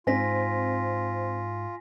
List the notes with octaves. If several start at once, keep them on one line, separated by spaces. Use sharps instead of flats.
G#2 C4 F4 G#5 A#6 B6